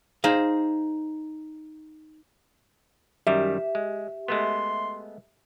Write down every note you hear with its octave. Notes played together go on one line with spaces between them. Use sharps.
D#4 G#4 C5 F5
F#2 D#3 G3 G4 E5
G#3
G#3 A3 B3 C6